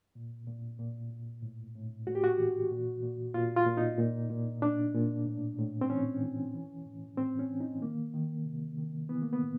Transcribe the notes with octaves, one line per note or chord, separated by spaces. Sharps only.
A#2
A#2
A#2
A#2
A2
A2
A2 F#4
G4
F#4
E3
A#2
A#2
A#2 F4
F4
A#2
D#4
A#2
A#2
A#2 D4
A#2
A2
A2
C4
E3 C#4
E3
E3
A2
A2 C4
C#4
E3
D#4
D#3 A#3
D#3
C3
D#3
E3 B3
A#3
B3
A2